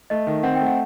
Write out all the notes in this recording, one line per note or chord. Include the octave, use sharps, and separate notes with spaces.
A3 D#5
D#3
C4 F#5
G5
A3
F#5